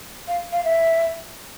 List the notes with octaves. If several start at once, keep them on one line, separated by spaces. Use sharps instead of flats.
F5
F5
E5